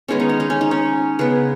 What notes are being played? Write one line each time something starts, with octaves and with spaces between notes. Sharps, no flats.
D#3 G#3 B3 C#4
D#4
C#4
D#4
C#4
D#4
C#4
C#3 G#3 B3 B4